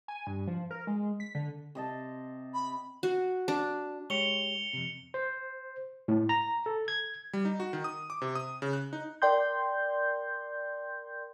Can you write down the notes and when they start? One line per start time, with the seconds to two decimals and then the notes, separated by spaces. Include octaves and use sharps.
0.08 G#5
0.27 G2
0.47 F3
0.71 A#4
0.87 G#3
1.20 B6
1.35 D3
1.75 C3 D#5 A5
2.53 B5
3.03 F#4
3.48 D4
4.10 G#3 G4 C#5 C#7 F7 G7
4.73 F2 C3
5.14 C5
6.08 A2
6.29 A#5
6.66 A4
6.88 G#6
7.33 G3
7.45 D#4
7.60 F#4
7.73 D#3
7.84 D#6
8.10 D6
8.22 C3
8.35 D#6
8.62 C#3
8.73 F#6
8.93 D#4
9.22 A#4 D5 G5 C6 G6